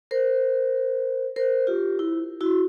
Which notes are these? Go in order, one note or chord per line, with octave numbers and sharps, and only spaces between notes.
A#4 C5
A#4 C5
F4 G4
E4
E4 F#4